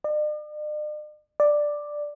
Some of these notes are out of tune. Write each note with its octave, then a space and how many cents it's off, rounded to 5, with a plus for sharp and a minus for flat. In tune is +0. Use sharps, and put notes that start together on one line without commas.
D5 +45
D5 +5